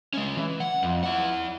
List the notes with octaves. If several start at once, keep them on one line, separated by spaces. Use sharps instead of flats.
G#3 C#4
E3
F#5
F2
E4 F#5